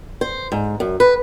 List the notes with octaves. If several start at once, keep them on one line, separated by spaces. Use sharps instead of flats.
C5
G#2
F#2
B4